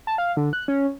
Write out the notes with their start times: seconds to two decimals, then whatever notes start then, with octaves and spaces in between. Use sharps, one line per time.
0.07 A5
0.18 F5
0.37 D3
0.53 F#6
0.68 C#4